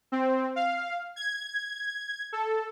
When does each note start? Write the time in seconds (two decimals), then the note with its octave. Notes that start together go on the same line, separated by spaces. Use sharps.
0.12 C4
0.56 F5
1.16 G#6
2.33 A4